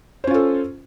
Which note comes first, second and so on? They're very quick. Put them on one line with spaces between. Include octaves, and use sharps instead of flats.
C5 C#4 F4 A4